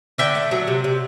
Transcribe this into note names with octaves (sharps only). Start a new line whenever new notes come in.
D3 E5 G5
A3
F#3
C3
C3